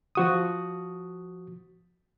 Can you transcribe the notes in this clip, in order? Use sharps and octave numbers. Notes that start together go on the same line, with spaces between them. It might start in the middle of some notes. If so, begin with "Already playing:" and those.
F3 F#4 D#6